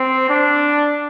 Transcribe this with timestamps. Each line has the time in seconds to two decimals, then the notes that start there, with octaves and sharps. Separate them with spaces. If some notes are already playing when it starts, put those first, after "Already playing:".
Already playing: C4
0.29 D4